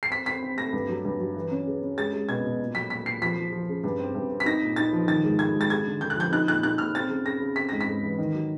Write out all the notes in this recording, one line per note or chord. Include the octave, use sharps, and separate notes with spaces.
C7
C4 B6
C4 B6
C4
A3 A#6
G2
F#3
G2
F#3
E3
C#4
C#3
C#4
G#3 A6
G#3
B2 G#6
B2
A#2
F#3 B6
A#2 B6
A#2 C7
F3 B6
F3
F3
C#3
G2
C4
G2
C4
B6
D#4 A#6
A#2
D#4 A6
F3
D#3 A6
G#2
G#3 G#6
G#3
A6
G#3 G#6
D3
D3 G6
F#6
F3 G6
D#4 F#6
A#2 F#6
D#4 F#6
A#2 F6
C4 A6
C#3
C#3 A#6
C#3
C4 B6
G#2 A#6
B6
G#2
E3
D#3
F#3